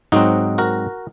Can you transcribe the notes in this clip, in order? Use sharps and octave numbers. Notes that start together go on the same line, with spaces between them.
G#2 F#3 C4 D#4 F#4
F#4 A#4